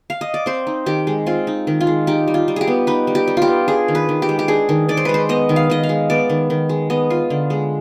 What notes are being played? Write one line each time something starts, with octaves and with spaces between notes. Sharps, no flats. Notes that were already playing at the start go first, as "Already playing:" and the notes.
F5
D#5
D5
C4 C5
D#4
D#3 G4
G#3
C4 F4
D#4
D#3
F4
G#3
D#4 G4
G3
F4
G3
G4 G#4
B3
D#4 B4
G3
G4
G3
F4 G4
B3
D4 G#4
D#3
B4
D#3
G4
G#3
G4
D4 G#4
D#3
D#3 D5
C5
G#3 B4
C5
B3 D#5
D#3
F5
D#3 D#5
F5
G#3
B3 D5
D#3
D#3
G#3
B3 D#5
F4
D3
G#3